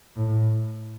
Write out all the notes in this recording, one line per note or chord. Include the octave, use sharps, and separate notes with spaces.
A2